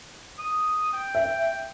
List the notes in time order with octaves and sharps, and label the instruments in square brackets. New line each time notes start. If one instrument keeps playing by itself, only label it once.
[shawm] D#6
G5
[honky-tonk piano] E5